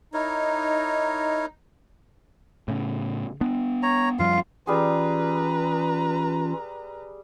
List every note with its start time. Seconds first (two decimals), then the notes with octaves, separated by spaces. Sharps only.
0.14 D#4 E4 A#4 C#5
2.68 A2 C#3
3.41 B3 D4
3.83 C#5 A#5
4.19 F#2 F3 G3 F4 F5
4.67 E3 G3 C#4 F4 G#4 B4 A#5